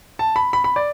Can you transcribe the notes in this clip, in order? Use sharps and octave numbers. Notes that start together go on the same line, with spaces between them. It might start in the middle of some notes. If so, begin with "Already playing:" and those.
A5
B5
B5
B5
D5